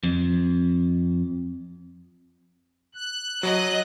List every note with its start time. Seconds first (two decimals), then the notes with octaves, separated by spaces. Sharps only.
0.03 F2
2.95 F#6
3.43 F#3 D#5